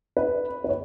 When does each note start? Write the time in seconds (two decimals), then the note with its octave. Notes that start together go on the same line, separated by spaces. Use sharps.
0.17 B4
0.64 B4
0.69 C#5